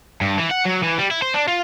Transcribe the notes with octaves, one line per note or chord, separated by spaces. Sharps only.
G2
E3
F#5
F#3
E3
G3
E4
C5
D4
F4